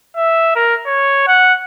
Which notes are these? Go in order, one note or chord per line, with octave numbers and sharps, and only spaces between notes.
E5
A#4
C#5
F#5